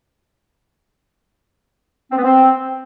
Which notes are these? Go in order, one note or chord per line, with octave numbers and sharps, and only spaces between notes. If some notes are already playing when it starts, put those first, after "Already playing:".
C4
B3
C4